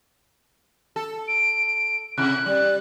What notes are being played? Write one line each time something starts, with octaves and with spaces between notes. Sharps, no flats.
A4
D7
C3 E4 F#6
G3 D5